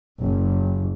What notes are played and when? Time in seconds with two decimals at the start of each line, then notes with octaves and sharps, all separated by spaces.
0.21 F#1